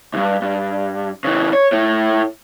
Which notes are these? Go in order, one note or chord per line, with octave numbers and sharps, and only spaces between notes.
C2 G2
G2
C#3 E3
C#5
A2 A3